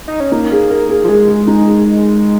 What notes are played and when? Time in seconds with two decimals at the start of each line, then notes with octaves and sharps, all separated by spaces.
0.08 D#4
0.20 C#4
0.32 A#3 D#4
0.52 G#4
0.70 A#4
0.90 G#4
1.04 F3
1.08 G#3 G#4
1.28 G#4
1.47 D#4
1.66 G#4